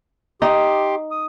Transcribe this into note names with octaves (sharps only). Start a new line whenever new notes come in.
D#4 G4 C6 D6
D#6